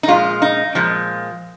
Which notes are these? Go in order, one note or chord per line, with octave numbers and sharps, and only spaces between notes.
D#4
A#2 F3 G#3 F4
D#4
A#2 F3 G#3